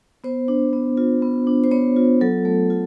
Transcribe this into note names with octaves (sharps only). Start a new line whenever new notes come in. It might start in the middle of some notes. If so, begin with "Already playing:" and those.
B3 C5
D4
B3
F4
B3
D4
C5
B3 C#5
F4
F#3 A4
A3
F4